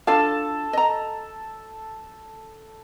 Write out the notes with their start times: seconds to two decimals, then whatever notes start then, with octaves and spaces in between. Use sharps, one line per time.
0.07 D4 F4 A4 F5 A5
0.73 D#5 A#5